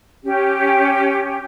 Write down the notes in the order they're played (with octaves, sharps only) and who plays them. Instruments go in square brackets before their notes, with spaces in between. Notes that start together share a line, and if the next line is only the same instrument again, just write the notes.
[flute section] C#4 G4